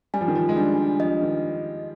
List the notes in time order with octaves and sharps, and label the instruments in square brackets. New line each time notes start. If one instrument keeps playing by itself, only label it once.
[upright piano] G3 [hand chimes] G#5
[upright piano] F3
D#3
F3
G#3
[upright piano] G3 [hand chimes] D4
[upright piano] F3 [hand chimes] D#5
[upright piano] D#3